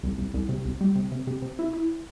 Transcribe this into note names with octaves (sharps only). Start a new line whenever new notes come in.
C2
C2
C2
C3
C2
G3
C3
C3
C3
C3
E4
E4